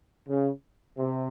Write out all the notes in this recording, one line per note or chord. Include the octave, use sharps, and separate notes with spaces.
C#3
C3